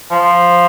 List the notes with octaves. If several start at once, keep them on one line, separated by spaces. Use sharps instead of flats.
F3